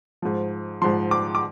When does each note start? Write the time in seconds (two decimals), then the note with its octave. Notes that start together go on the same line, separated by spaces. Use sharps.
0.22 G#2 F3
0.82 G#2 F3 C6
1.11 D6
1.35 D6